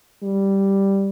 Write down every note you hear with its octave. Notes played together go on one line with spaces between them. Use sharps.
G3